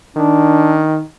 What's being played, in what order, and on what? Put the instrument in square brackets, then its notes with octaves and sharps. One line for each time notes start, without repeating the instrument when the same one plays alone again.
[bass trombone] D#3 [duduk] D4